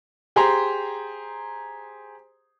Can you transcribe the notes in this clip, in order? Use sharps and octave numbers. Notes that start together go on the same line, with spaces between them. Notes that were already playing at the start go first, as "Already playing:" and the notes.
G4 G#4 C5 A#5 C6